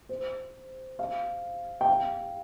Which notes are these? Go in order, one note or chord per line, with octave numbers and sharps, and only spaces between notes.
C5
F5
G5
F5